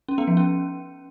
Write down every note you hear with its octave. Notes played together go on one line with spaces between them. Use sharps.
C#4
B3
F3
C#4